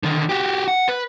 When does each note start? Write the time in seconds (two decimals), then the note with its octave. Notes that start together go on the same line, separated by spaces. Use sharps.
0.03 D3 D#3
0.29 F#4 G4
0.68 F#5
0.89 B4